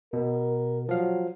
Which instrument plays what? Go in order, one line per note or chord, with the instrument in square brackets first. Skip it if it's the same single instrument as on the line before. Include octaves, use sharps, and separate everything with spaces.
[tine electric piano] B2 [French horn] A#4
[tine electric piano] F3 F5 [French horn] F#3